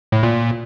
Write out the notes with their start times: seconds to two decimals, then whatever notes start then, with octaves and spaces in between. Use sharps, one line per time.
0.12 A2
0.23 A#2